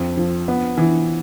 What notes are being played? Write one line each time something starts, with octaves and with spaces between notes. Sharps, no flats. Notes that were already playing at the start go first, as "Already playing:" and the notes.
Already playing: F2
F3
B3
E3